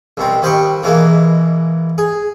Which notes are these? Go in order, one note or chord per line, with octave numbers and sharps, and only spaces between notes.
C2 B2 C4
D#2 G3 C5 D#5 G5 C#6
B2 E3 G#3 A#3
G#4